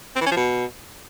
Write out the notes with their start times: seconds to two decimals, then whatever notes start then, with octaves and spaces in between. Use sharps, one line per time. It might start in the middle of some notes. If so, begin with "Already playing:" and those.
0.16 C4
0.21 E3
0.26 C#4
0.31 F3
0.36 B2